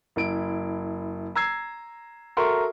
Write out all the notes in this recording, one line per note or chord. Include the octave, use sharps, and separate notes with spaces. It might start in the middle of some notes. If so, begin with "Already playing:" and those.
F#1 E4 D7
A#5 E6 G#6 C7
F#4 A4 A#4 E5 C6 C#6